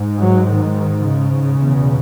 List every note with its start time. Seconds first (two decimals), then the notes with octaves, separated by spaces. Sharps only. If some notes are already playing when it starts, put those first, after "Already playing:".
Already playing: G#2
0.21 F#3
0.49 D#3
1.06 C#3
1.62 E2 B2